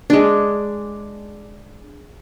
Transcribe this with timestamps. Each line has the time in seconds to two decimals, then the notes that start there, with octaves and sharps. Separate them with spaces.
0.10 G#3 D4